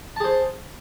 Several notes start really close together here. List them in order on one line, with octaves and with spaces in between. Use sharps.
A5 G#4 C5